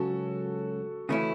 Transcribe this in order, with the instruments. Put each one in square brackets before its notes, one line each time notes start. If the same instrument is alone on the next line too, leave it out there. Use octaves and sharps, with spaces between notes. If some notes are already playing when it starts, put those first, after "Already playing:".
Already playing: [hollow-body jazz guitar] C#2 C#3 F#3 C#4 [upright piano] F#4 A4
[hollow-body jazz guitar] C#3 E3 A3 C#4 E4